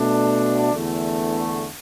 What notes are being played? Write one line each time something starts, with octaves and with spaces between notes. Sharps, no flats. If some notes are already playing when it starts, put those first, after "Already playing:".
Already playing: B2 A3 D4 F#4
E2 D3 A3 E4